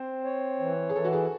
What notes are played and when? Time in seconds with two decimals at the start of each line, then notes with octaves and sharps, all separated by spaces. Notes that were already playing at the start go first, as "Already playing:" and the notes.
Already playing: C4 C5
0.25 C#5
0.60 E3
0.89 G#4
0.95 E3 A4
1.05 F#4
1.13 G#4